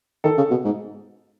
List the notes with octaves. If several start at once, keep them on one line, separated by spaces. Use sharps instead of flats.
D#3 A4
C#3
B2
G#2